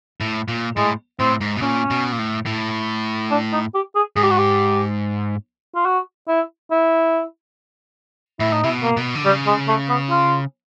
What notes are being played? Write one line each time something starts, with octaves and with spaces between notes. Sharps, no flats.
A2
A#2
A2 G#3
A2 C4
G#2
B2
A#2 C#4
B2
A#2
A2
A2
D4
D#4
G4
G#4
G#2 G#4
G4
F#4
G4
F4
F#4
E4
E4
A2 E4
D#4
C3 E4
B2
A#3
B2
D3
C#3 G3
G#3
A3
B3
F4